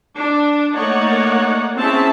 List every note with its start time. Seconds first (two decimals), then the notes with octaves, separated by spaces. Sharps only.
0.18 D4
0.73 A3 A#3 D#4 C#5 D5 F#5
1.78 C4 C#4 E4 G#4 E5 A5